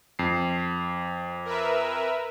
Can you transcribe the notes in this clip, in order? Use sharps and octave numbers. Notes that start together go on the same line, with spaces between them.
F2 C7
A#4 B4 E5